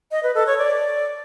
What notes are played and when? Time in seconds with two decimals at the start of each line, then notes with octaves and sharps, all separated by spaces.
0.11 D#5
0.23 B4
0.35 A4
0.47 C#5
0.58 D5